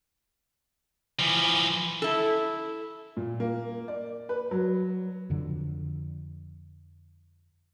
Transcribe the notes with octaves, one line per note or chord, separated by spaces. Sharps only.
E3 F3
E4 A4
A#2
A#3
D5
B4
F#3
F2 D3